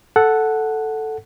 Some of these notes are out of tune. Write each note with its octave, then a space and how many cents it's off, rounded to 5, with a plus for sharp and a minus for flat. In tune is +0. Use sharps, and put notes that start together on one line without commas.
A4 +0 F#5 +0